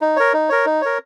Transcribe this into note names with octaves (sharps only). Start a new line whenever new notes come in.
D#4
A#4 C#5
D#4
A#4 C#5
D#4
A#4 C#5